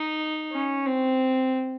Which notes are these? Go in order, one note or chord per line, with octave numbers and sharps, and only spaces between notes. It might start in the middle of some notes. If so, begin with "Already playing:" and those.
Already playing: D#4
C#4
C4